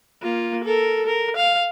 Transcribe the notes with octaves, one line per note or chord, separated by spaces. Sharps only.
A#3 F4
A4 A#4
A#4
F5